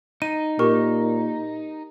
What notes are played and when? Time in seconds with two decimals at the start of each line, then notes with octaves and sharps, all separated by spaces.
0.22 D#4 D#7
0.59 A#2 G4 A#4 C#6